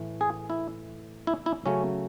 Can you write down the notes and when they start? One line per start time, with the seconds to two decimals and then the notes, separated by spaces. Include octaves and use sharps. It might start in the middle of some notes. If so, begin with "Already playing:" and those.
Already playing: A2 E3 A3
0.21 G#4
0.50 E4
1.27 E4
1.46 E4
1.66 C#3 F#3 A3 C#4